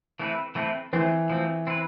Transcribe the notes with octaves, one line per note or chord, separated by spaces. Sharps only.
E3 A3 C4 E4 B4
E3 A3 C4 E4 B4
E3 F3 A3 C4
F3 A3 C4
C4 E4 B4